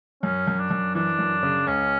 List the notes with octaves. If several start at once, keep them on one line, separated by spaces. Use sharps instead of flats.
F#2 C#4
F#2
D4
F#2
E3 D4
F#2
C#3
C#2 C#4